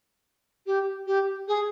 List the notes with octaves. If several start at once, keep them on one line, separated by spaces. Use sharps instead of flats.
G4
G4
G#4